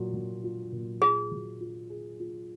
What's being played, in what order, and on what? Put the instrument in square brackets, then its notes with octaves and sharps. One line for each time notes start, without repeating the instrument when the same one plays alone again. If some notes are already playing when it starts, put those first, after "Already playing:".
Already playing: [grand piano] A#2 F#3 F4
F#3
F4
A#2
[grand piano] F4 [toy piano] G#4
[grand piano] F#3
F4
G#4
F4